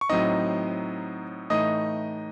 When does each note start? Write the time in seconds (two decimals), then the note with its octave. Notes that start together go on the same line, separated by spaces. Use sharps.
0.01 C#6
0.09 A2 F#3 C4 D#4 D#5 D#6
1.50 A2 E3 A3 D#4 D#5 D#6